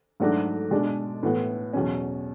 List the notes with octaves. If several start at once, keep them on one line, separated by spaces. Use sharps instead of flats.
G#2 F#3 A3 D4 F#4
B2 G#3 D4
A2 E3 B3 F#4
E2 B2 F#3 C#4